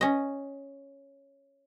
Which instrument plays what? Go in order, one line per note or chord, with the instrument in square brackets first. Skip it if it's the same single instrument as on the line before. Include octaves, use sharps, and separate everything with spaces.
[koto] C#4 D#5